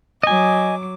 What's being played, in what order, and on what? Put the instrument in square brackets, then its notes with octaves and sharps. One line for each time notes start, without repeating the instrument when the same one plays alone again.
[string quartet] F#3 D6 [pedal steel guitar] D#5 G#5